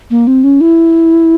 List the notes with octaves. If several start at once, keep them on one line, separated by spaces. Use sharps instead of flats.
A#3
C4
C#4
E4